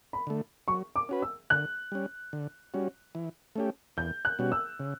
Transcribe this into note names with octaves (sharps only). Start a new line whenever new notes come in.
B5
D3 A3
F#3 C#6
D6
C#4 F#4 B4
E6
D3 F#6
G3 C#4
D3
G3 C#4 F#4
E3
A3 C#4 G4
E2 G6
F#6
B2 G3 C#4 F#4
E6
C#3